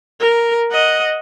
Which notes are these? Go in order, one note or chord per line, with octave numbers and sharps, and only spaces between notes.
A#4
D#5 F#5